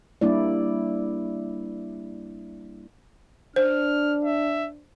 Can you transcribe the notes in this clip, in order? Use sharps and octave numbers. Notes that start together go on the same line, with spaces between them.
G3 A#3 D4 E4 D5
D4 C5 F6
E5